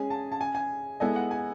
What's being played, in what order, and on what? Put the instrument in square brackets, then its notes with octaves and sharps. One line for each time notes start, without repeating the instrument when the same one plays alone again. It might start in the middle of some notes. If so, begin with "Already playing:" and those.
Already playing: [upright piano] G#3 C#4 G#4 [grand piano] G#5
[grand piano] A5
A5
G#5
G#5
[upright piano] G#3 B3 E4 A4 D#5 [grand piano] G#5
[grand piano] F#5
G#5